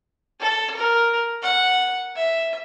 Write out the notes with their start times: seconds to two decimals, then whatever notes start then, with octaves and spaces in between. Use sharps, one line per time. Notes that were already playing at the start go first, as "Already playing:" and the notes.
0.40 A4
0.76 A#4
1.43 F#5
2.16 E5